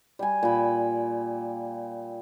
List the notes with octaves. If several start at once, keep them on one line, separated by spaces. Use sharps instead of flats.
G3 G#5
A#2 B5